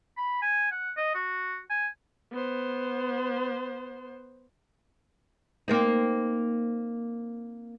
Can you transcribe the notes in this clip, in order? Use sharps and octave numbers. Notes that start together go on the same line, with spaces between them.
B5
G#5
F#5
D#5
F#4
G#5
B3 C5
A#3 C4 D#4